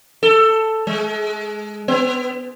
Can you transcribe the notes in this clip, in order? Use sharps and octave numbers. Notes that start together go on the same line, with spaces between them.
A4
G#3
B3